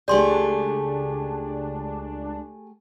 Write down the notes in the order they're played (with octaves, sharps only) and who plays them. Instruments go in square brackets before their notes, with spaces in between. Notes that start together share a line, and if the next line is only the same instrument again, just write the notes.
[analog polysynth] C#2 D4 [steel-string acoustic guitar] A3 G4 G#4 [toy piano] D5 C6